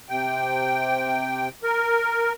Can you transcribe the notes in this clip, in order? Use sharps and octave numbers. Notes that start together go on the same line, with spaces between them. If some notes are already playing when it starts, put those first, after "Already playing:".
C3 G5
A#4